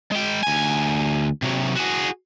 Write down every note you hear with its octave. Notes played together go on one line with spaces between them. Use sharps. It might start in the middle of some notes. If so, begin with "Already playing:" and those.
G#3 G5
D2 G#5
C3 F#3
F#4 G#4